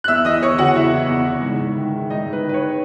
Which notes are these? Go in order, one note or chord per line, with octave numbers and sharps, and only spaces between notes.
F#6
E2 E5 E6
E3 D#5 D#6
E2 C#5 C#6
C#3 F#4 F#5
E2 E4 E5
E3
E2
C#3
G#2
G#2
D#3
D#3
G#2 D#4 D#5
G#2
B4
D#3
B4
C#5
D#3